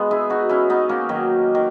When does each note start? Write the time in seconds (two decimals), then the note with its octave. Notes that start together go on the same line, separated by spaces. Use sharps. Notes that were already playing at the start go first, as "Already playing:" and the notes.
Already playing: G#3 B3
0.11 E4 G#4
0.30 D#4 F#4
0.49 C#4 E4
0.70 B3 D#4
0.89 A#3 C#4
1.09 D#3 F#3
1.55 D#3